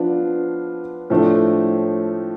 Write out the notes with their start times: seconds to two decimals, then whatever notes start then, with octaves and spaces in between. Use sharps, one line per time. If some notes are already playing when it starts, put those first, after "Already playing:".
Already playing: F3 B3 D4 F4
1.10 A2 F3 A3 D4